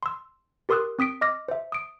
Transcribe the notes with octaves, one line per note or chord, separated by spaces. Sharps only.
C6 E6
G4 A#4 C6 D#6 E6 F#6
C4 D#6 B6 D7
D#5 D6 F6 A#6
C5 E5
D#6 D7